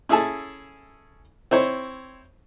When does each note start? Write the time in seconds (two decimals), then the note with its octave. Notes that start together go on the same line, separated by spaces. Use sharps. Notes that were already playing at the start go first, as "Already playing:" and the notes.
0.09 C#4 E4 G#4 A4 A5
1.51 C4 E4 C5 C#5